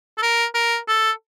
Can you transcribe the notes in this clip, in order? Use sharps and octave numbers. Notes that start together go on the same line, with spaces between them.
A4
A#4
A#4
A4